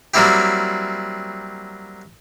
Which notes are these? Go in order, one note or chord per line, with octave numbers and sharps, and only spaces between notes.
F#3 G3 A#3 C4 E4 G4